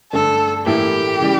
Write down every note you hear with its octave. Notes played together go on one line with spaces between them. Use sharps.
G2 D3 A3 A4
A2 E3 A#3 E4 G4
C#3 E3 G3